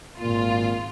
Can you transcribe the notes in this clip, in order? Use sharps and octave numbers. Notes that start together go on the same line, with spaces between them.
G#1 A#2 F4